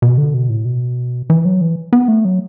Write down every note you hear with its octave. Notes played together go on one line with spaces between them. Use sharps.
B2
D3
B2
A2
B2
E3
F#3
E3
B3
A3
F#3